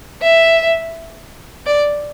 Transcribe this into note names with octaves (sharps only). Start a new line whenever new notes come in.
E5
D5